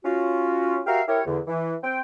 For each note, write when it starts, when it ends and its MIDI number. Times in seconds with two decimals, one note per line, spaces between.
0.04 0.81 61
0.04 0.81 65
0.04 0.81 66
0.87 1.02 66
0.87 1.02 67
0.87 1.02 70
0.87 1.02 76
0.87 1.02 77
1.08 1.20 64
1.08 1.20 67
1.08 1.20 70
1.08 1.20 73
1.26 1.39 40
1.26 1.39 50
1.47 1.75 52
1.83 2.01 60
1.83 2.01 79